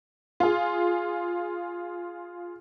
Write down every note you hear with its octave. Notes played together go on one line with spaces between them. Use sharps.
F4 G#4